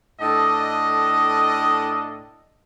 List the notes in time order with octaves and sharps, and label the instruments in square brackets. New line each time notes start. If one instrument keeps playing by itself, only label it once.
[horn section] A2 D4 A4 D#5